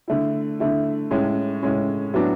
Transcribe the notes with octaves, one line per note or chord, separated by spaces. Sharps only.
D3 A3 E4
D3 A3 E4
A2 G#3 C#4
A2 G#3 C#4
A2 F#3 B3 D4 F#4